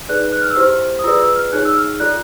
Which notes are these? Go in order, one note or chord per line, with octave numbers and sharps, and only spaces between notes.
D#4 G#4 B4 D5 F#6
F#6
F6
E6
E4 G4 C5 F6
D#6
F4 G#4 B4 D5 E6
E6
F6
D#4 G#4 C#5 F#6
E6
F6
F4 A4 D5 F#6